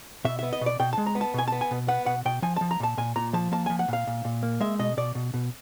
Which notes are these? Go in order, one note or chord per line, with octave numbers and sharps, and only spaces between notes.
B2 E5
B3 E5
D#5
B2
D5
B2 G5
A5
G#3
A#5
B3
A5
B2 G#5
A5
B3
G#5
B2
B3 F#5
B2 F#5
B2 G5
F3 G#5
F3 A5
A#5
A#2 A5
A#2 G#5
A#2 A#5
F3 A5
A#3 A5
F3 G#5
F#5
A#2 F5
A#2
A#2
A#3
G#3 E5
B2 D#5
B2 D5
B2
B2